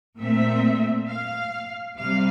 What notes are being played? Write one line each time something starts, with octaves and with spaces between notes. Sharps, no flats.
A#2 A3 C4 E5
F5
C3 G3 F5